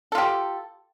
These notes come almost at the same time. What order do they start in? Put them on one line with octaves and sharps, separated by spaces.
A4 F4 G4